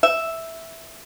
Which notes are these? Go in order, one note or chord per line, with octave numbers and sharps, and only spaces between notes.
E5